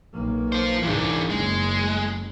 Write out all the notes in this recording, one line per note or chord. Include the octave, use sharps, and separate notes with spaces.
B1 A#3
F4 C5
C#2 G#2 E3 D4
F#1 G#3